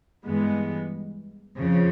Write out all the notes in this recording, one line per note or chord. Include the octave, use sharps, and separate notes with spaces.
G2 E3 G#3 B3
F2 C#3 F3